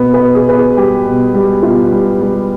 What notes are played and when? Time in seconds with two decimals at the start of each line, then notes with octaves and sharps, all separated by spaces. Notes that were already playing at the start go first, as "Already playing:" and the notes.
Already playing: B2 B4
0.14 B4
0.20 B2
0.35 G#4
0.49 B2 B4
0.56 G#4
0.77 G3 G4
1.07 B2
1.34 G3
1.63 B2 F4
1.91 G3
2.21 G3